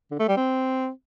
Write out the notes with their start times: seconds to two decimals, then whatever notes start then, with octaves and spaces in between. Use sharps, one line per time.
0.11 D3
0.19 A3
0.28 G3
0.37 C4